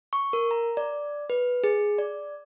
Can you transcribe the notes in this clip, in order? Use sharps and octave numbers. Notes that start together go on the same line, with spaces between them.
C#6
A#4
A#5
D5
B4
G#4
D5